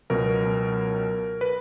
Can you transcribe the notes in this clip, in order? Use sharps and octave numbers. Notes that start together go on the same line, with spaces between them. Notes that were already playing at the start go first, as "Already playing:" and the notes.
C#2 B2 F#3 A#4
B4